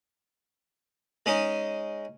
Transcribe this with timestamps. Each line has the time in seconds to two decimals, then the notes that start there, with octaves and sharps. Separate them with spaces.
1.26 G#3 C#4 D#4